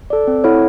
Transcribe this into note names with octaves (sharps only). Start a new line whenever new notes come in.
A4 D5
C4
E4 A4 C#5 F#5